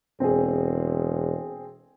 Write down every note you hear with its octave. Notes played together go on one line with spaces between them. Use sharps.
E1 C4 G#4